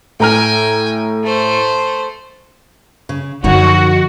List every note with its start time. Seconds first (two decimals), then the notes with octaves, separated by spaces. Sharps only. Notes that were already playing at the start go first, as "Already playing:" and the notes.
0.20 A2 G5 G#5 A#5 F6
1.24 A3 C5
3.09 C#3
3.44 F#2 D3 F3 D#4 F#4 C#5